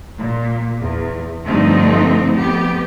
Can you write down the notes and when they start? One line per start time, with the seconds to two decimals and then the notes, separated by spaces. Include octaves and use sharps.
0.18 A#2
0.79 E2
1.46 G2 D3 F3 A3 C4 D#4
2.34 F2 B3 G4